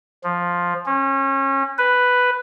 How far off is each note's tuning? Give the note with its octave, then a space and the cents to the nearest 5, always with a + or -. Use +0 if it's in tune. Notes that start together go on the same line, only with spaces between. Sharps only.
F3 +5
C#4 -30
B4 +5